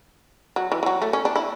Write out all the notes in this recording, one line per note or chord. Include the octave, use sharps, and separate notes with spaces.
F#3
E3
E3
F#3
A3
C#4
D4
E4